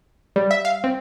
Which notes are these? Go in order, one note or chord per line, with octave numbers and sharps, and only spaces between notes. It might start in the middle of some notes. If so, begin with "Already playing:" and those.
G3
E5
F5
C4